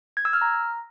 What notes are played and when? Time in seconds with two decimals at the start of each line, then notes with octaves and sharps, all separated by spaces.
0.17 G#6
0.25 E6
0.33 F6
0.42 A#5